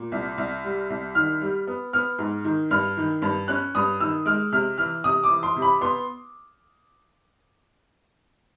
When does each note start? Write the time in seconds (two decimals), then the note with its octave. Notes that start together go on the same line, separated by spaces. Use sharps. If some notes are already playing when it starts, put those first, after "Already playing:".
Already playing: A#2
0.12 C2
0.38 C2
0.64 G3
0.90 C2
1.15 D#3 F6
1.41 G3
1.67 B3
1.93 B3 F6
2.18 G#2
2.44 D#3
2.71 G2 F6
2.97 D#3
3.22 G2
3.48 C#4 F#6
3.75 G2 D#6
4.01 D#3 E6
4.26 G#3 F6
4.52 C3 F6
4.78 E3 F6
5.04 C3 D#6
5.24 D6
5.30 E3
5.43 C6
5.56 C3
5.62 B5
5.81 B3 C6